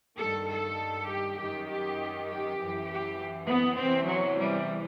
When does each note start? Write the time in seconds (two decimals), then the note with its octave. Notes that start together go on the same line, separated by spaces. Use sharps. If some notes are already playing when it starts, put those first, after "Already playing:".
0.17 G2 D#3 A4
0.48 A4
1.08 G4
1.38 F#2 D#3 G4
1.68 G4
2.29 G4
2.59 F#2 E3
2.89 G4
3.49 B3
3.79 E2 C3 E3 C4
4.09 F#3
4.39 G3